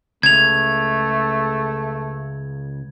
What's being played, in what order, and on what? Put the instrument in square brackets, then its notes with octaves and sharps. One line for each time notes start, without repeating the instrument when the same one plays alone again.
[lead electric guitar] C#2 [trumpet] A3 [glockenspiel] G#6 F7